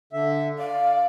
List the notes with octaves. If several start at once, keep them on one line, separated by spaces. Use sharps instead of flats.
D3 E5
D5 F5